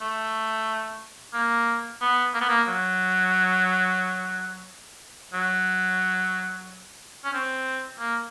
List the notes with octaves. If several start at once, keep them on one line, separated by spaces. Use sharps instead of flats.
A3
A#3
B3
A#3
B3
A#3
F#3
F#3
C#4
C4
A#3